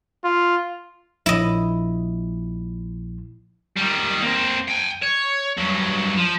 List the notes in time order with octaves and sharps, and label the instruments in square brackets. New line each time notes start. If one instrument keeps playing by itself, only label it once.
[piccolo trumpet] F4
[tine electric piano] A#1 [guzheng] E4 D#5
[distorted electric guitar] D#3 G3
A#3 C4
G5 G#5
C#5
G2 F#3
F3